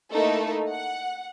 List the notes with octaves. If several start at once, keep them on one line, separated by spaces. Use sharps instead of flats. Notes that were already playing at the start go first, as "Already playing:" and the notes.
A3 A#3 D#4 E4 A4
F#5